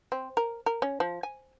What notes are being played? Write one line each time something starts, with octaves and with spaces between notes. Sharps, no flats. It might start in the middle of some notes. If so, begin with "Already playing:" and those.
C4
A#4
A#4
C#4
F3
G#5